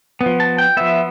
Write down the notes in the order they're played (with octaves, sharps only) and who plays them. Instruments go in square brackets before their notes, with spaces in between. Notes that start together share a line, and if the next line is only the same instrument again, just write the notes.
[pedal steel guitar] B3
F3
A5
G5
F3 B3 E5